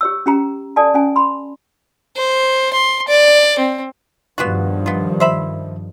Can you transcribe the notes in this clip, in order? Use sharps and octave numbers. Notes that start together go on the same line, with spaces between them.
G4 C#5 E6
C#4 G4 A#5
A4 D5 G#5 A5
C#4 G#5
B5 C6
C5
C6
D5
C4
G2 D#3 F3 B3 F4 F#4
B3 F4
C5 E5 B5